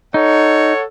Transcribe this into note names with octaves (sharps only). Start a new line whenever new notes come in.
D#4 A4 C#5 F#5